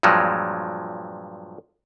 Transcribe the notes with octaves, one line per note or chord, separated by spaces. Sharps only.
G2 A#2 F3 F#3 G#3